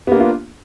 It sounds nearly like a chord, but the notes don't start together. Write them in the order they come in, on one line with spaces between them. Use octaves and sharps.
B3 A#3 D4 F4